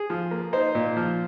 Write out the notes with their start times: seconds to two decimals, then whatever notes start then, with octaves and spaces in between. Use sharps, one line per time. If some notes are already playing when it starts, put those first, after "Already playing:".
Already playing: G#4
0.10 F3
0.31 A#3
0.53 D#4 C5
0.75 A#2
0.97 F3